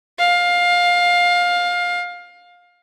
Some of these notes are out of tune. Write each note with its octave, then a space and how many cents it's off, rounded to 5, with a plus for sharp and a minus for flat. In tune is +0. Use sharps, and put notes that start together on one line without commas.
F5 +20